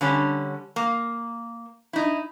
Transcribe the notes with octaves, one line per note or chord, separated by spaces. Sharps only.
D3 G3 C#4
A#3
D#4 E4